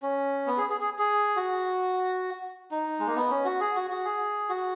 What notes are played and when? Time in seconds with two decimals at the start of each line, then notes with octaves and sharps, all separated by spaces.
0.02 C#4
0.47 B3
0.58 G#4
0.70 G#4
0.81 G#4
0.99 G#4
1.36 F#4
2.71 D#4
3.00 G#3
3.07 A#3
3.15 B3
3.31 C#4
3.45 F#4
3.61 G#4
3.76 F#4
3.90 F#4
4.05 G#4
4.49 F#4